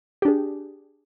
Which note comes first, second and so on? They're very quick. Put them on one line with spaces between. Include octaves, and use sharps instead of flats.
G4 D4 G#4